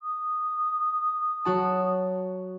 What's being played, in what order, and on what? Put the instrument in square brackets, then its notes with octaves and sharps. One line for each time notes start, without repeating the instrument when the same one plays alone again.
[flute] D#6
[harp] F#3 F#4 A5